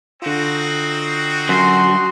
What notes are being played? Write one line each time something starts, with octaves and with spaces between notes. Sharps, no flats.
D3 C4 D#4 F4 F#4
F#2 C6